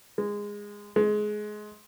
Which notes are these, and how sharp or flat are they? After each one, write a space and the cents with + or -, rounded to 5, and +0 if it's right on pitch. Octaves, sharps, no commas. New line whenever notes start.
G#3 -15
G#3 +20